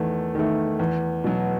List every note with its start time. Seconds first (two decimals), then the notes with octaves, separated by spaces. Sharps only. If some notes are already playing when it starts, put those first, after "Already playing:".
Already playing: E2 D#3 A3
0.35 D#3 A3
0.79 E2
1.24 B2 F#3